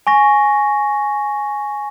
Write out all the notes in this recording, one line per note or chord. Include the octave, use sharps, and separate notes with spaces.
G#5 C#6 A#6